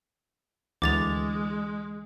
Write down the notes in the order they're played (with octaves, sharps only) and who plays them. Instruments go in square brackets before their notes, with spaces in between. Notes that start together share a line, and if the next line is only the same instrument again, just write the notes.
[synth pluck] D2 [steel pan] E3 [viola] G#3 [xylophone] D6 A6 F7